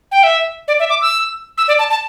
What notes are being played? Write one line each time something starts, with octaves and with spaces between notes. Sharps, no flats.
G5
E5
D5
E5
D6
E6
E6
D5
A5
A5